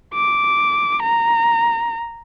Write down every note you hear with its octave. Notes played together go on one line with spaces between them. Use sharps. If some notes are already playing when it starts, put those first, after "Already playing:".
D6
A#5